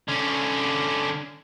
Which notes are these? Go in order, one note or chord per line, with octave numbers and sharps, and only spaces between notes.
D3 C#4